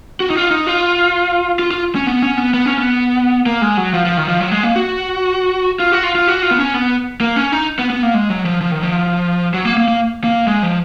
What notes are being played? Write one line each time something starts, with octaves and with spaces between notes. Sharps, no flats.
F#4
D#4
F4
D#4
F4
F4
F4
C#4
B3
C#4
B3
B3
C#4
B3
A#3
G#3
F#3
F3
F3
D#3
F3
F#3
G#3
A#3
F#4
F4
F#4
F4
F4
F#4
F4
B3
C#4
B3
A#3
C#4
D#4
B3
B3
A#3
G#3
F#3
F3
F3
D#3
F3
F#3
A#3
A#3
A#3
A#3
G#3
F3